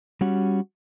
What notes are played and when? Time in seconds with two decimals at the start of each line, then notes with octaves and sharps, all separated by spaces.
0.21 G3 C#4 F#4